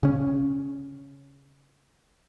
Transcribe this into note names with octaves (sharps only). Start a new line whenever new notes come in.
C#3 C#4